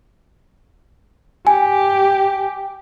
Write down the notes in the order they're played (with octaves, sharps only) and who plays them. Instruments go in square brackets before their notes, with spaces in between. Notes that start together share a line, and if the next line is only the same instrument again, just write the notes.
[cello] G4 [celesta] G#5